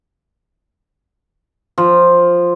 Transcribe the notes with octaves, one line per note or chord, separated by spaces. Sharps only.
F3